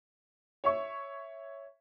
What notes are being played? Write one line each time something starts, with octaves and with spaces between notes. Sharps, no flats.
C#5 E5 C#6